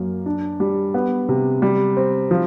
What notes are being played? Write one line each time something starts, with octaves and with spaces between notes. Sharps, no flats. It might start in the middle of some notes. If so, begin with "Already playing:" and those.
Already playing: F#2 A#3
D4
G3
B3
C3
G3
C4
F3